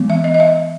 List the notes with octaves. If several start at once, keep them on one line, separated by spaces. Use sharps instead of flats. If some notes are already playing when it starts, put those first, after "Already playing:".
Already playing: E3 G#3 B3
E5
D#5
D#5
E5